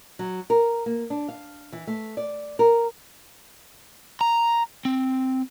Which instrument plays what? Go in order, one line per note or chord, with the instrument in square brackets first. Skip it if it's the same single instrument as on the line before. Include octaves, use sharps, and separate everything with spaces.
[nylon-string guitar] F#3
A#4
A#3
D4
F5
E3
A3
D5
A#4
[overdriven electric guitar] A#5
C4